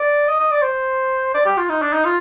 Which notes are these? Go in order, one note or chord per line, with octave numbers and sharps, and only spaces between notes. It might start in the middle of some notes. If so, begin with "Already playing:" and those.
Already playing: D5
D#5
D#5
D5
C5
D5
G4
F4
D#4
D4
D#4
F4